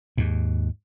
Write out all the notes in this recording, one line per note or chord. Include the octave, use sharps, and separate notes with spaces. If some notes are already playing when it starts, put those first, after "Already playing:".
D#2 G#2